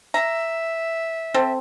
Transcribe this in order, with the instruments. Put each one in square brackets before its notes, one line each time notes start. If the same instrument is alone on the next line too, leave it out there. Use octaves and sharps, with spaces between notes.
[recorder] E5 [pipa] A#5
[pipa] C4 A4 C5